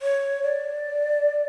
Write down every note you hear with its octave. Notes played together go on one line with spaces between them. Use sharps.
C#5
D5